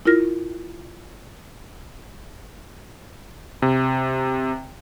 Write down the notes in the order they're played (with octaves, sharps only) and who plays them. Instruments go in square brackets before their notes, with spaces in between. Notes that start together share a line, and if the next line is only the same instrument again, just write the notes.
[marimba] E4 F4 A#4 F6 A#6
[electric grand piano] C3